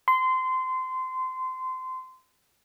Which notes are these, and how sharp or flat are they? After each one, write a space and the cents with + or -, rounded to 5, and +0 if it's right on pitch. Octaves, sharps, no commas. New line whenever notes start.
C6 -20